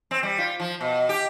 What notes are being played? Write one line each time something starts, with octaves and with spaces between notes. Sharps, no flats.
C4
G3
F4
F3
B2
G4